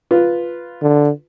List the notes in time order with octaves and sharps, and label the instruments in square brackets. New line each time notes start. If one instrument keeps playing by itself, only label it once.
[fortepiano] F4 B4
[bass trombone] D3